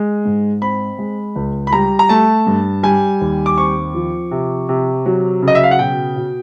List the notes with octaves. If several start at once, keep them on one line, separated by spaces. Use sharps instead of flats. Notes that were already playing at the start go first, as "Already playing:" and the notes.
Already playing: G#3
G#2
C4 B5
G#3
C#2
B5
G3 A#5
A#5
A3 A5
G2
G3 G#5
D#2
D6
C4 C#6
F3
C3
C3
F#3
C#3
D#5
E5
F5
F#5
B2 G5
B2